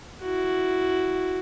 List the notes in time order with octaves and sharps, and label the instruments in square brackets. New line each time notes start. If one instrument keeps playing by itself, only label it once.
[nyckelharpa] E4 F#4